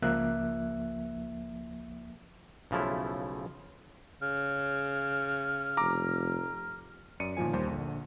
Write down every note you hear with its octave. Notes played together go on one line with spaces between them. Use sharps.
C#2 F3 A#3 E5 F#6
B1 C#3 F3 A3 E4
C#3 F6
F1 A#5 D6
F#2 D5 C#7 D#7
G1 A#2 D#3 F3 G#5
D#2 G3 C5
A#1 D3